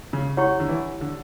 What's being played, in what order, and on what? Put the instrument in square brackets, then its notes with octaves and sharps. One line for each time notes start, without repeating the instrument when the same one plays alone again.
[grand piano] C#3
[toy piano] E4 G4 C#5 F#5 C#6
[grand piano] D3
E3
D3